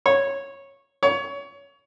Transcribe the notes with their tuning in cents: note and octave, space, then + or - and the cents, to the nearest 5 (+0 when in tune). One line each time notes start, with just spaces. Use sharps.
C#5 -10
C#5 +25